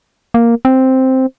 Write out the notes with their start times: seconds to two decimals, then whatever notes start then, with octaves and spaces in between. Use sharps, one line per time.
0.34 A#3
0.65 C4